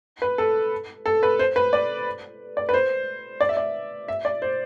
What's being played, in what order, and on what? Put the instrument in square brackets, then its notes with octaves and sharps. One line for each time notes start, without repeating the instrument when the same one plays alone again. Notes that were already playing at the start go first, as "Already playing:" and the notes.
[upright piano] B4
A4
A4
B4
C5
B4
D5
D5
B4
C5
D5
E5
D5
E5
D5
C5